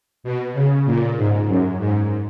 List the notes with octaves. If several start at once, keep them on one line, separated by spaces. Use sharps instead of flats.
B2
C#3
A#2
G#2
F#2
G#2